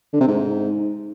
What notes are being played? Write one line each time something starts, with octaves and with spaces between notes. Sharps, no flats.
D3
C3
G#2